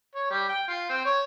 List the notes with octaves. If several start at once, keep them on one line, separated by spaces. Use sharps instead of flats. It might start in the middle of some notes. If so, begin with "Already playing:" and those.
C#5
G3
G5
F4
C4
C#5